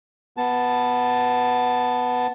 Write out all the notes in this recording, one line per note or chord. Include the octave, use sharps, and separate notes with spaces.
B3 A5